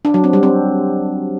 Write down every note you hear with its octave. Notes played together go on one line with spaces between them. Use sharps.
D4
F#3
C4
G3
C4